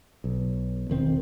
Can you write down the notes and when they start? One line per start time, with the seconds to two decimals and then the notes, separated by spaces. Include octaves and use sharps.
0.24 B1
0.90 E1 D#3 C4